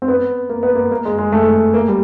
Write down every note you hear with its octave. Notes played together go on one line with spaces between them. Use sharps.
C4
B3
A#3
B3
A#3
A#3
G#3
G#3
A3
A#3
G3